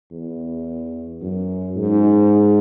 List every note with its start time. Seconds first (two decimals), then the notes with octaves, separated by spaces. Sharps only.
0.11 E2
1.21 F#2
1.76 G#2